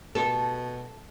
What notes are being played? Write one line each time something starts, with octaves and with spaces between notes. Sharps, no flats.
B2 A4